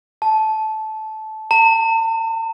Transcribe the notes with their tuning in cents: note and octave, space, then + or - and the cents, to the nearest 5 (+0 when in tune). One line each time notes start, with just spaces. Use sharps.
A5 -15
A5 +45